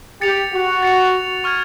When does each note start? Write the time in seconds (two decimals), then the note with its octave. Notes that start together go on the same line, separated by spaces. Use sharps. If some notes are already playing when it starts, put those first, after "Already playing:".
0.21 G4 A6 C#7 F7
0.52 F#4
0.83 A6 C#7 F7
1.44 C#6 F6 G#6